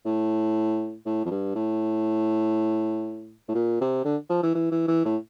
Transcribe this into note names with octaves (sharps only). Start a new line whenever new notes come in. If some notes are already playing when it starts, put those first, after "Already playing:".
A2
A2
F2
G2
A2
A2
A#2
C3
D3
F3
E3
E3
E3
E3
A2